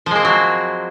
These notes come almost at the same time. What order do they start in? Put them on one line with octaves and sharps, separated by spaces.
F3 G#3 A#3 C4 F#3